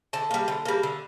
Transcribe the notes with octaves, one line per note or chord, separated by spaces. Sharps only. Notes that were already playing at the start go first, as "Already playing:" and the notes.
D3 A5
G3 A#3
D3
G3 A#3
D3